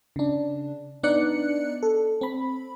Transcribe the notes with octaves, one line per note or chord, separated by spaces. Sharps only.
C#3 D4
B3 D4 D#4 D5 F#6 C#7
A4
C4 B5